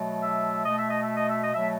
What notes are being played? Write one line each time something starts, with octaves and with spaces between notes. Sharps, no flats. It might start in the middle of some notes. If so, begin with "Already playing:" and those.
Already playing: B2 F#3 A3
E5
B2 A3 D#5
E5
D#5
E5
D#5
E5
D#5
B2 F#3 A3 E5